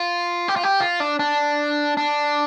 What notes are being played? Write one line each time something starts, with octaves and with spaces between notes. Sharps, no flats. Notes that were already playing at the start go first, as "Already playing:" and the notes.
Already playing: F4
G4
F4
G4
F4
D4
D4
D4